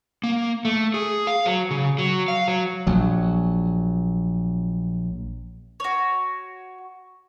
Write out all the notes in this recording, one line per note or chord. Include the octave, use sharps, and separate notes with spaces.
A#3
A3
G#4
F5
F#3
C#3
F#3
F5
F#3
A#1 F#3
F#4 C#5